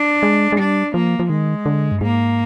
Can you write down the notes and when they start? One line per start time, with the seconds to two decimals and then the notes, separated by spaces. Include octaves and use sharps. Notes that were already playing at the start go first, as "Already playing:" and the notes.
Already playing: D4
0.23 G#3
0.52 G#3
0.58 G3 D4
0.94 F3 A#3
1.19 F3
1.29 D#3 G#3
1.66 D3
1.92 G2
2.01 G#2 A#3